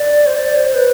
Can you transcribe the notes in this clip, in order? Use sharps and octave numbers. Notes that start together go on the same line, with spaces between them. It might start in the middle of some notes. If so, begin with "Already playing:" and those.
Already playing: D5
C5
D5
C5
B4